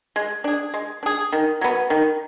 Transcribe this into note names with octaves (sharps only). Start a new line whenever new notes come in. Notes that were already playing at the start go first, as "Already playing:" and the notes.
G#3
D4 G#4
G#3
D4 G#4
D#3
F#3 B3
D#3